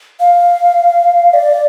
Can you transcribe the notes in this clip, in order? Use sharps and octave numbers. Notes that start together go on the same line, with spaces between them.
F5
D5